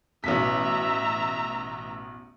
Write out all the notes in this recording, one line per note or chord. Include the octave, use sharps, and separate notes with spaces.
A1 B2 E5 A#5 B6